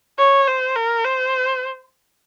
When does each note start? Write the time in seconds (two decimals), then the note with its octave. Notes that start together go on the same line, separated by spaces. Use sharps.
0.18 C#5
0.48 C5
0.76 A#4
1.05 C5